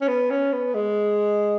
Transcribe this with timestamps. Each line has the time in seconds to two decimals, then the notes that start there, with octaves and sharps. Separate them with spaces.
0.01 C#4
0.08 B3
0.30 C#4
0.53 B3
0.74 G#3